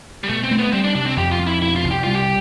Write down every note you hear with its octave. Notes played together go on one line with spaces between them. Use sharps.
G3
B2 A3
C4
A3
B3
G3 C4
D4
C3 D4
C4
F2 G4
F4
F2
E4
B2 E4
F4
C2
G4
G3 F4
G4